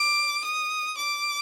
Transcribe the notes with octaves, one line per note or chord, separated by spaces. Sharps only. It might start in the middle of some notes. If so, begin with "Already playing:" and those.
Already playing: D6
D#6
D6